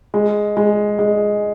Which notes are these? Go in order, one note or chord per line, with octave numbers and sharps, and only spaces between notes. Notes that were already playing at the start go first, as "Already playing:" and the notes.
G#3
G#3
G#3